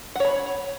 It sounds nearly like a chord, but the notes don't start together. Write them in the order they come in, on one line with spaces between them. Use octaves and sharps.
F#5 C#5 B5